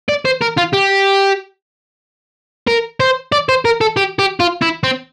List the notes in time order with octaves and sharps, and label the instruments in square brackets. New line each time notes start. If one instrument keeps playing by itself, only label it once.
[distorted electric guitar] D5
C5
A#4
F4
G4
A#4
C5
D5
C5
A#4
A4
G4
G4
F4
E4
C4